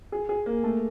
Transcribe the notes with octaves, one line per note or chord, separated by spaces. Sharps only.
G#4
G#4
A#3
A3